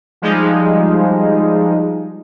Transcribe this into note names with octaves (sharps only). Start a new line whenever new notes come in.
F3 G3 G#3 D#4